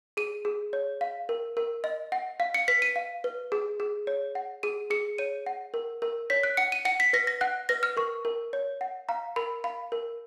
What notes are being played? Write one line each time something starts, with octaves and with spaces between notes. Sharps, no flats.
G#4 D#7
G#4
C#5
F5
A#4
A#4
D#5
F#5
F5
C#7
B4 B6
D#7
F5
B4
G#4
G#4
C#5
F#5
G#4 D#7
G#4 C#7
C#5 D#7
F#5
A#4
A#4
C#5 B6
F#6
F#5 C#7
D#7
F#5 C#7
B6
B4 A#6
A#6
F#5 F#6
B4 A#6
F6
A#4 C#6
A#4
C#5
F#5
F5 A#5
A#4 B5
F5 B5
A#4